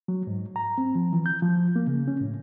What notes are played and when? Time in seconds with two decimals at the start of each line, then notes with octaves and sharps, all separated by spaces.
0.08 F#3
0.27 G#2
0.56 A#5
0.78 C4
0.95 F3
1.13 E3
1.26 G6
1.42 F3
1.76 A#3
1.87 C#3
2.07 C#4
2.21 A2